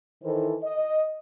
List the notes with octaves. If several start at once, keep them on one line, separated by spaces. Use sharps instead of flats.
D#3 E3 E4 A4 C5
D#5